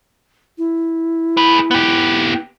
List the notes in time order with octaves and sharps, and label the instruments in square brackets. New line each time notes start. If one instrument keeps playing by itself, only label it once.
[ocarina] E4
[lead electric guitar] G#4 B4
B3 G4